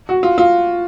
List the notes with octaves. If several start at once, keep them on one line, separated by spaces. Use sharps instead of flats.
F#4
F4
F4